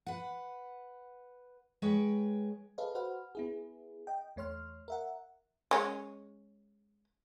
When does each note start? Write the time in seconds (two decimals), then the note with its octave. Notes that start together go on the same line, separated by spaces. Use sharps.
0.06 B4 F#5
1.82 G#3 B4 C#5 G5
2.78 G#4 A4 B4 D#5 F5
2.95 F#4 B4 C5 F#5 F6
3.35 B3 E4 G#4
4.07 D#5 G5
4.36 E2 A3 C#5 C6 F6
4.88 A#4 E5 F#5
5.71 G#3 C#4